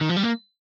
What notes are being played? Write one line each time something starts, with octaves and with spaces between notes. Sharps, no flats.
D#3
F3
G3
A#3